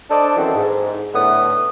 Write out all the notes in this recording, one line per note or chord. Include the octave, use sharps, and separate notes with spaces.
D4 A4 C5 D5 D#5
D#3 E3 F#3 C4 C#4 A4
G#2
A2 D3 B3 E4 F#5 D#6